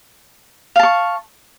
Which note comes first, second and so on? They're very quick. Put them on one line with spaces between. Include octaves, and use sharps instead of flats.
F5 A5 C#6